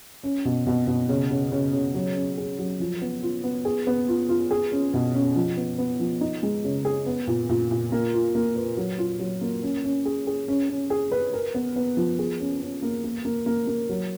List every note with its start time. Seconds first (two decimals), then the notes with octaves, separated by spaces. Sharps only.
0.24 C#4
0.45 B2
0.67 B2
0.87 B2
1.09 C#3
1.31 C#3
1.52 C#3
1.73 C#3
1.94 F#3
2.16 C#4
2.37 G#4
2.59 F#3
2.80 F3
3.01 B3
3.23 F4
3.44 B3
3.65 G#4
3.87 B3
4.08 F4
4.29 F4
4.51 G#4
4.72 C#4
4.94 B2
5.14 C#4
5.36 F3
5.57 B3
5.78 B3
6.00 F3
6.21 D#4
6.43 G#3
6.64 C#3
6.85 G#4
7.06 B3
7.27 A#2
7.49 A#2
7.71 A#2
7.92 A#3
8.14 F4
8.35 A#3
8.56 B4
8.77 F#3
8.98 F4
9.19 F#3
9.41 A#3
9.63 C#4
9.84 C#4
10.05 G#4
10.27 G#4
10.48 C#4
10.69 C#4
10.90 G#4
11.12 B4
11.33 A#4
11.54 B3
11.76 B3
11.97 F3
12.19 G#4
12.40 C#4
12.62 C#4
12.82 A#3
13.04 A#3
13.25 A#3
13.46 A#3
13.67 A#3
13.89 F#3